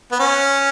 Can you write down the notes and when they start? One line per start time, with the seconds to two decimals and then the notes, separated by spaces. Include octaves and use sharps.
0.11 B3
0.19 C#4